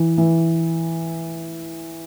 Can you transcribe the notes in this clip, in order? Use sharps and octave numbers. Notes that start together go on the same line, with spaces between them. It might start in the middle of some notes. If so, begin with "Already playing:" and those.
Already playing: E3
E3